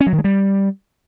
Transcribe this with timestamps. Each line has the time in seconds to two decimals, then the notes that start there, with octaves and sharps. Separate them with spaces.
0.01 C#4
0.07 F#3
0.12 D#3
0.18 G#3
0.24 G3